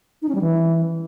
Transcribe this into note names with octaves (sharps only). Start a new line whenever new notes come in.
D#4
C#4
G3
E3